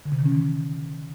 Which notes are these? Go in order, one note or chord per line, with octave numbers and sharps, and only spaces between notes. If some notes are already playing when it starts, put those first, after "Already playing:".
D3
C3
D#3
C#4
E3